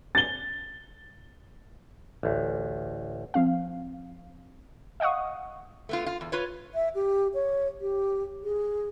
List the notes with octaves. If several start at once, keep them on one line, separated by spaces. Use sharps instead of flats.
A6 G7
A1 D2
F3 C4 F5
D#5 F5 F#5 C#6 D#6
A3 B3 F4
F4
E2
F4 B4 C#5
E5
G4
C#5
G4
G#4